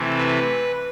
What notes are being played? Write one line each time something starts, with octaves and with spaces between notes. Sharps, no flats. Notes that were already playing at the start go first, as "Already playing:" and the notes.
Already playing: C3 E3 A3
B4